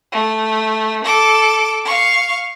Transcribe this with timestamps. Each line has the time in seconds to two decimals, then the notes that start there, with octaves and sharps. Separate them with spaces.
0.12 A3
1.05 A4 D6
1.85 F5 C#6